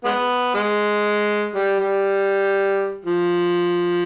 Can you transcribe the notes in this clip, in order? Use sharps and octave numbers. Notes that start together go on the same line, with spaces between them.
G#3 B3
G#3
G3
G3
F3